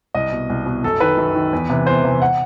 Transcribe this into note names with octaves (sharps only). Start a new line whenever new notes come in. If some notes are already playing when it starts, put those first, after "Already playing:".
C2 D#5
B2
C2
B2
F#2 A4
D#3 B4
F#2
D#3
E2
C3 E3
E2 C5
C3 E3
F#5